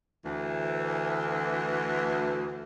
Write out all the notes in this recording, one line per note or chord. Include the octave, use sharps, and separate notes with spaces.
D2 E3